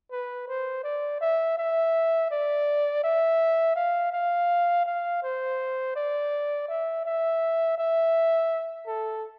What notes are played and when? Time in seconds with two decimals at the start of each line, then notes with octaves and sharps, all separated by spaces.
0.11 B4
0.48 C5
0.84 D5
1.21 E5
1.58 E5
2.31 D5
3.04 E5
3.76 F5
4.13 F5
4.86 F5
5.23 C5
5.96 D5
6.68 E5
7.05 E5
7.78 E5
8.87 A4